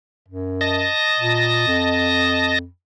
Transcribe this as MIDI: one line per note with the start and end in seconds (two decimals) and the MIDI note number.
0.28 0.90 42
0.61 2.59 75
0.61 2.59 81
0.61 2.59 94
1.19 1.65 46
1.67 2.67 41